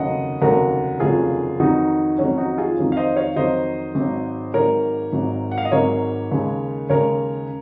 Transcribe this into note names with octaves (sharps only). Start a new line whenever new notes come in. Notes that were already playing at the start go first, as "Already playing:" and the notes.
Already playing: F1 D#2 C#3 F#3 D#5 F#5
F1 D#2 C#3 F#3 F#4 A#4
F1 D#2 C#3 F#3 F4 G#4
F2 D#3 F#3 D#4 F#4
F2 D#3 F#3 C#4
D#4 F#4
F4 G#4
F2 D#3 F#3
F5
C5 D#5
C#5 F5
F2 D#3 F#3 C5 D#5
G#1 G#2 F#3
G#1 G#2 F#3 A#4 C#5
G#1 G#2 F#3
F#5
F5
D#5
G#1 G#2 F#3 A#4 C#5
D#2 C#3 G#3
D#2 C#3 G#3 A#4 C#5